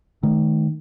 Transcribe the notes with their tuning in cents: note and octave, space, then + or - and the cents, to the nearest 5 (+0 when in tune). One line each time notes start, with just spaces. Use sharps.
D#3 +0 A3 -40